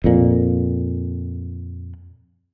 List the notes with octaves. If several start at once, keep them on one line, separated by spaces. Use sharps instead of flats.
F2 A#2